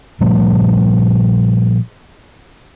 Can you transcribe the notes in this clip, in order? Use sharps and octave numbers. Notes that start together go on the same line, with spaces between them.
A#2 F3 G3 A3